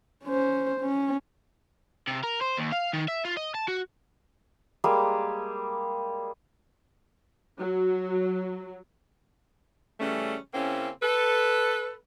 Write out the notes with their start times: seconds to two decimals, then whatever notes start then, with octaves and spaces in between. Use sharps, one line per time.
0.25 C#4 C5
0.81 C#4
2.07 C3
2.24 A#4
2.42 C5
2.58 D#2
2.72 F5
2.93 D#3
3.08 E5
3.25 F4
3.37 D#5
3.54 A5
3.68 F#4
4.84 G3 G#3 A#3 G#4
7.59 F#3
10.00 C#3 E3 G3 A3 C#4
10.54 C#3 A#3 C4 C#4 E4
11.02 A4 B4